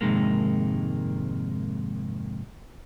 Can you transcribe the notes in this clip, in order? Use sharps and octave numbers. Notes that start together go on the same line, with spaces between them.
F2 G#2 C3 D#3 G#3 A#3